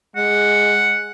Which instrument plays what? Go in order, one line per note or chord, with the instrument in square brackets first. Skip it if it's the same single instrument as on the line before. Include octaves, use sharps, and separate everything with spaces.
[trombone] G#3 [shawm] F#5